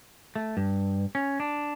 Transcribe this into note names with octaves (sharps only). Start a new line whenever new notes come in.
A3
G2
C#4
D4